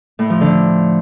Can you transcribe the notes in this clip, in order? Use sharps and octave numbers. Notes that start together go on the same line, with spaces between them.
A2
F3
D3